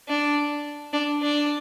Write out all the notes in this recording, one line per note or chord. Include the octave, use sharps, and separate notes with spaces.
D4
D4
D4